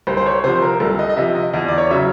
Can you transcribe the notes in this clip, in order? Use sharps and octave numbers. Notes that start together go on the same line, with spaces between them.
C2 C5
C5
C#5
C3 F3 C5
A#4
C2 A4
D#5
D#5
C3 F3 E5
D#5
E2
D5
C#5
C#3 F#3 E5